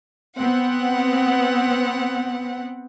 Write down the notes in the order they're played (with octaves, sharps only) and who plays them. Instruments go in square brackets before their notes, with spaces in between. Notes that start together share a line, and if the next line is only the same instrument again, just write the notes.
[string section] B3 C4 F#5